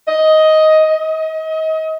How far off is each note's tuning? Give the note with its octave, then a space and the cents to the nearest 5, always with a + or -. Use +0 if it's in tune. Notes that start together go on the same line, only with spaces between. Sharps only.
D#5 +10
D#5 +35